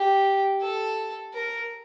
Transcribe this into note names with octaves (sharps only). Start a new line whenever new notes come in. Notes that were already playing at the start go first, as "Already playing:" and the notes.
Already playing: G4
A4
A#4